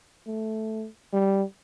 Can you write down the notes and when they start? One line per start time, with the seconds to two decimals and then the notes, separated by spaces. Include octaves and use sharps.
0.27 A3
1.13 G3